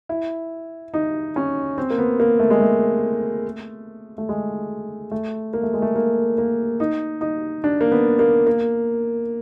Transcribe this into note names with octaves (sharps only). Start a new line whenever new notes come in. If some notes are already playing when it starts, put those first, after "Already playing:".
E4
D#4
C#4
C4
A#3
B3
A#3
A3
G#3
A3
A3
G#3
A3
A#3
A3
G#3
A3
A#3
A#3
D#4
D#4
D4
A#3
B3
A#3
A#3